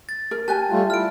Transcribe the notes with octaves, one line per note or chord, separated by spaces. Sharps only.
A6
A#4
G4 G#5 A5 F#6
G3 A3 F4
E4 F6 D7